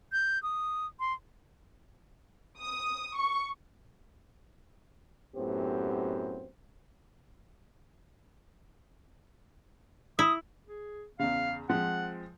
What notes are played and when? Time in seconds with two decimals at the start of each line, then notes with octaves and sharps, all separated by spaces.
0.12 G6
0.43 D#6
1.00 C6
2.58 D#6
3.15 C#6
5.36 F#2 A2 B3 C4 G4 C5
10.19 E4 D#6
10.67 G#4
11.19 E2 C#3 F5
11.69 F3 G#3 C4 F#5